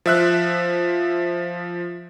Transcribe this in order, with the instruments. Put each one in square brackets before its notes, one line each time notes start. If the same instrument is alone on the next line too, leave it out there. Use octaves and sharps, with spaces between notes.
[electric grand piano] F3 E5 F#6